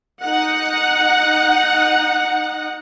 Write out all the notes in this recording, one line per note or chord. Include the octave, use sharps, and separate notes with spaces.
D#4 F#5